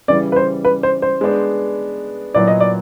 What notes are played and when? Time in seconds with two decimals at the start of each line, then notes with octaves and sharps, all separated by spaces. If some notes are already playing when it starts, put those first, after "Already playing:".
0.08 C#3 E3 G3 D5
0.32 B4
0.36 C5
0.65 B4
0.83 C5
1.02 C5
1.21 G#3 B3 D4
2.34 A#2 F#3 B3 E4 D5
2.48 D#5
2.60 D5